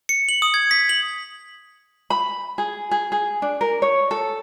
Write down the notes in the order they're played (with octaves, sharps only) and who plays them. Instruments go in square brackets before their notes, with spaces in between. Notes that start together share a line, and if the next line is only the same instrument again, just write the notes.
[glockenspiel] C#7
F#7
D#6
G#6
B6
F#7
[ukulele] B5
G#4
G#4
G#4
D4
A#4
C#5
A4